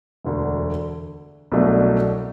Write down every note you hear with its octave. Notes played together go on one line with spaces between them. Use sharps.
E1 D2 D3
C2 B2 F#3 A3 D4